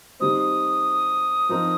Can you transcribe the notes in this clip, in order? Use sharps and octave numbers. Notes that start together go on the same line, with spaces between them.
D#3 G3 C4 D#6
F3 C4 D#4 A#4